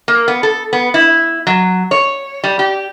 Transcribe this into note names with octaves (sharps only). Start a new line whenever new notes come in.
A#3
B3
A4
B3
E4
F#3
C#5
G3
G4